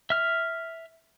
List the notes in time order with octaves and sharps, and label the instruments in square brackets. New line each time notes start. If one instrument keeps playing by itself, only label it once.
[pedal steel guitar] E5 F6